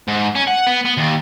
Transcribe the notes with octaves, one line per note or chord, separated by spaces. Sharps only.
G#2
C#4
F#5
B3
B3
D#2